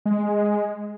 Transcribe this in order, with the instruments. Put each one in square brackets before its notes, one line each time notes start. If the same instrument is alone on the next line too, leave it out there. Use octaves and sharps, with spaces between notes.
[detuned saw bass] G#3